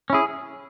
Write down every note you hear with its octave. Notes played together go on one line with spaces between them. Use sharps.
C#4 E4 G#4